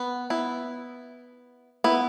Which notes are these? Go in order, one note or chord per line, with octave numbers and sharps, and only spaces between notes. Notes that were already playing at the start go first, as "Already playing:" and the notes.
Already playing: B3
B3 E4
B3 E4